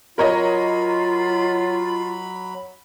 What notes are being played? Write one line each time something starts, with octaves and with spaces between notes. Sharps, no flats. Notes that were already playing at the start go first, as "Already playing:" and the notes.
F#3 F4 A#4 C#5 D#5 B5